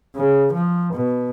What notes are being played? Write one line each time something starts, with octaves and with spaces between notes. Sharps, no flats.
C#3
F3
B2